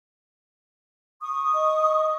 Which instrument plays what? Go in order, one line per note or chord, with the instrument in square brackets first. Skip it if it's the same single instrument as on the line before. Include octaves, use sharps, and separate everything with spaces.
[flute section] C#6 D#6
[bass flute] D#5